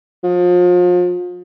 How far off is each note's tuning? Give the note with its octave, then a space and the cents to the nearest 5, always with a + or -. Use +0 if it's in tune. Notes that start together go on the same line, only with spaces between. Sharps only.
F3 +35